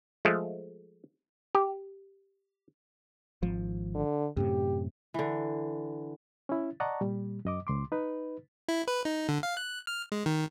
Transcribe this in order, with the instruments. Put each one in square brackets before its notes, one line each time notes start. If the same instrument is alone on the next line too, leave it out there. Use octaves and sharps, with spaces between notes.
[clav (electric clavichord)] F3 G#3 A3
G4
[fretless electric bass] G#1 F3
[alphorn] D3
[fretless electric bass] F#2 A2 C3 [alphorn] G4
[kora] D3 E3
[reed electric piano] C#4 E4
D5 D#5 F#5 A5 A#5 C#6
A#2 G3
F#2 D#5 D6
C#2 C6 D6
D#4 B4
[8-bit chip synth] E4
B4
D#4
D3
F5
F#6
F6
G#3
D#3